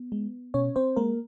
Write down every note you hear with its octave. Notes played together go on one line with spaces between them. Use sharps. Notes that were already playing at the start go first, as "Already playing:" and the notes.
Already playing: B3
G#3
B2 C#4 C#5
C4 C5
G#3 A#3 A#4